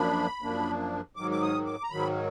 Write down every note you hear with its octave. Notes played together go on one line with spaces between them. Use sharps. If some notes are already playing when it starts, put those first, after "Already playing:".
Already playing: F#2 F3 A#3 D4 B5
F#2 F3 A#3 D4
G#2 D#3 F#3 D6
D6
D#6
D6
A#5
G#2 D#3 F#3 B5